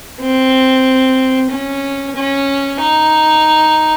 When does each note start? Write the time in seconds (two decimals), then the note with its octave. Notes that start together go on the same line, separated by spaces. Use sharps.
0.21 C4
1.50 C#4
2.16 C#4
2.80 D#4